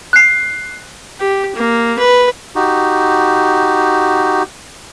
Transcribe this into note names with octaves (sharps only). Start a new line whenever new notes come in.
F#6 C7
G4
A#3
B4
D#4 F#4 G4